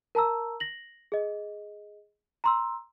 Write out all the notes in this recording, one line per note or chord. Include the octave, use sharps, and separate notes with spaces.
A#4 A5 A#5 E6
A#6 F#7
G#4 D#5
A#5 C6 E6